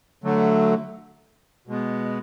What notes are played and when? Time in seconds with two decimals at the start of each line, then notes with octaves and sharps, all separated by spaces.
0.24 D3 F#3 A3
1.67 B2 G#3 B3